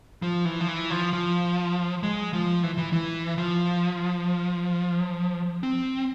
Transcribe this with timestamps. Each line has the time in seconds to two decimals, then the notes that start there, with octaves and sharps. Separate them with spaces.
0.22 F3
0.45 E3
0.60 F3
0.68 E3
0.90 F3
1.13 F3
2.03 G#3
2.33 F3
2.63 E3
2.78 E3
2.93 E3
3.38 F3
5.63 C4